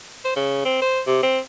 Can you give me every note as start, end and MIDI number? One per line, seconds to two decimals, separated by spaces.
0.25 0.33 72
0.36 0.61 49
0.65 0.79 60
0.81 1.00 72
1.06 1.22 48
1.23 1.39 60